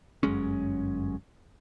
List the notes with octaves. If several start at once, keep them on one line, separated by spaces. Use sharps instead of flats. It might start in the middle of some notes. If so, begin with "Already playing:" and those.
G1 F#2 G#3 C#4